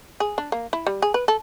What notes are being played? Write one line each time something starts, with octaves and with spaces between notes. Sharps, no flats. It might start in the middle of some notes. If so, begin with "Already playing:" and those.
G#4
D4
A#3
E4
G3
G#4
B4
A4